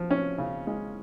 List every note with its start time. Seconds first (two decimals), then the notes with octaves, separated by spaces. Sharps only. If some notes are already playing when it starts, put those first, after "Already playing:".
Already playing: F3
0.10 C#4
0.38 C#3
0.67 G#3